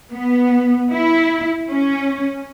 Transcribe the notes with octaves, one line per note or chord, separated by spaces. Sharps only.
B3
E4
C#4